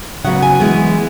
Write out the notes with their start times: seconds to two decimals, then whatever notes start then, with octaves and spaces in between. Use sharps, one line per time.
0.24 C#3 F#3 B3 F#5
0.43 G#5
0.60 E3 G#3 B3